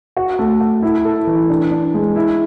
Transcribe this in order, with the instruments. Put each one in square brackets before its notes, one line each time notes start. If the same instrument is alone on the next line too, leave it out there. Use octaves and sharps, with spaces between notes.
[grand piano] F#4
A3
F#4
E4
A4
E3
D4
D4
G#3
E4